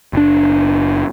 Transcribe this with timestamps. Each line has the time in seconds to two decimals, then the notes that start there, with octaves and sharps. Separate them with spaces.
0.13 F#1 D4